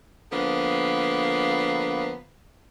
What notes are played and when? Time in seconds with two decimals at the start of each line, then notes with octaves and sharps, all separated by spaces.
0.32 D3 F3 A#3 B3